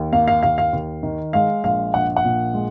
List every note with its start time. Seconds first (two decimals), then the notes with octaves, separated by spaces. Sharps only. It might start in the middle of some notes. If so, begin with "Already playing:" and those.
Already playing: D#2
0.12 A#3 F5
0.28 F5
0.43 D#2 F5
0.58 F5
0.73 D#2
1.03 D#3
1.33 G#3 F5
1.64 A#1 F5
1.94 A#1 F#5
2.16 F#5
2.25 A#2
2.54 G#3